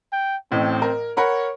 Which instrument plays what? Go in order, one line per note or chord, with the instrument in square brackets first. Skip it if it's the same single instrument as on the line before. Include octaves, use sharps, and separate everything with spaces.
[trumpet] G5
[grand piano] A1 A2 [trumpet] C4
[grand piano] A#4
[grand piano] A#4 F#5 B5 [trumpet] C#5